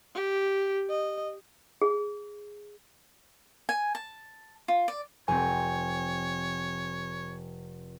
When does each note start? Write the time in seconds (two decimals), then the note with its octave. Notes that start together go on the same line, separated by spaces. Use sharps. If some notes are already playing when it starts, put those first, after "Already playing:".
0.15 G4
0.90 D#5
1.82 G#4
3.69 G#5
3.95 A5
4.68 F4
4.88 D5
5.28 F1 C4 C#5 G#5